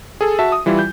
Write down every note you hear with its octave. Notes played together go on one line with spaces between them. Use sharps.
G#4 A4
F#4 E5 A5
D#6
E3 G3 E4 F4
G6